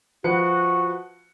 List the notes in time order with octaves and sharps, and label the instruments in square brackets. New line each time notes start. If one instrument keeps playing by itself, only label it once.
[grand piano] F3 B4 C#7 [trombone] F#4